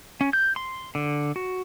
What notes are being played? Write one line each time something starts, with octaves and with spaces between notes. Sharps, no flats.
C#4
G6
C6
D3
F#4